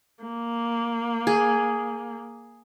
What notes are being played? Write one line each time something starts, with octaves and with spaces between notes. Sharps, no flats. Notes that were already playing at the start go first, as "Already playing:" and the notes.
A#3
G#4